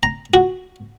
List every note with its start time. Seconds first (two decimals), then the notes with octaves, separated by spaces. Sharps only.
0.03 A#5
0.34 F#4